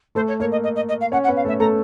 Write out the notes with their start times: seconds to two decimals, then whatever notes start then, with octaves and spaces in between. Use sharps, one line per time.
0.15 A3 A4 C5
0.28 C#5
0.40 A#3 A#4 C#5
0.51 D#5
0.63 D#5
0.76 D#5
0.89 D#5
1.01 F5
1.12 C#4 C#5 F#5
1.24 F#5
1.28 B3 B4
1.36 F5
1.45 A3 A4 E5
1.60 A3 A4 A#5